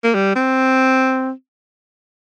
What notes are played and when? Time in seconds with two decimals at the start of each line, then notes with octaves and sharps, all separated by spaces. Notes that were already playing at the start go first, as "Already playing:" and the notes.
0.04 A#3
0.14 G3
0.36 C4